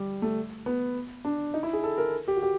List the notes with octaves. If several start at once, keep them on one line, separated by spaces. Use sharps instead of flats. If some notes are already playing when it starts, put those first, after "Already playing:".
Already playing: G3
A3
B3
D4
D#4
E4
G#4
A4
A#4
G4
F#4
G4